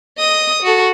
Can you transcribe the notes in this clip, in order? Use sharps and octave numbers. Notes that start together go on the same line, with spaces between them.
D#5 D#6
F#4 A4